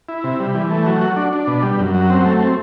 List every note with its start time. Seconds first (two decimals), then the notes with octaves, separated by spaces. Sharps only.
0.09 E4
0.24 C3
0.40 G3
0.55 E3
0.71 A3
0.86 F#3
1.01 F#4
1.16 D4
1.33 D4
1.47 B2
1.63 G3
1.79 F#2
1.94 F#3
2.10 C4
2.25 A3
2.40 C4